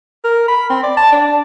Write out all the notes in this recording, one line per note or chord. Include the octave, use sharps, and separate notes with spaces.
A#4
B5
C4
D5
A5
D4